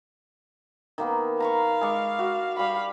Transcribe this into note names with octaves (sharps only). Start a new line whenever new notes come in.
D#3 A#3 B3
F5 A#5 B5 C#6
G#3 D5 C#6
F#4
G3 F5 B5 C#6